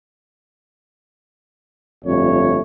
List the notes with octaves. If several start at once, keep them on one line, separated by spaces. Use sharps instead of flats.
G1 F2 A3 C#5